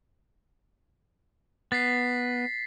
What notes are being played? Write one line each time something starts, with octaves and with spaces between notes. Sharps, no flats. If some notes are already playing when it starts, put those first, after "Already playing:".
B3 A6 B6 C7